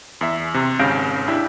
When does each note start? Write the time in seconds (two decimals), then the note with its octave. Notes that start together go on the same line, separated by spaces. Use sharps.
0.21 E2 E5
0.54 C3
0.79 G#1 C#3 F5 G6 A#6 D7
1.28 D4 E4 G4 E5